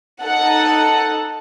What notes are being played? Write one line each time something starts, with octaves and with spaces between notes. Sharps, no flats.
D#4 A4 F#5